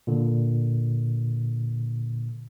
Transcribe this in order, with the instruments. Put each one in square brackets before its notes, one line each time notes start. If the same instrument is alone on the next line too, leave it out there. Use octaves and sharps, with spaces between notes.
[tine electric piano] A#2 D3